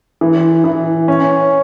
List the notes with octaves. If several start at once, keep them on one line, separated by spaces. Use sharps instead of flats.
E3
E3
C#4